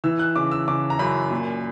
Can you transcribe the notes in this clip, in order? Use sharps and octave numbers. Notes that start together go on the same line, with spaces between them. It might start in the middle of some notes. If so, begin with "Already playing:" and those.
E3 E6
F#6
C#3 D6
E6
C#3 D6
A#5
F#2 B5
A#2